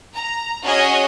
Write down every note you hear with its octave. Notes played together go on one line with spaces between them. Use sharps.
A#5
C#4 F#4 G#4 C#5 D#5